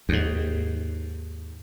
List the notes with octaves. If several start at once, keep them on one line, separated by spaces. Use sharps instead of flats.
D#2 G#2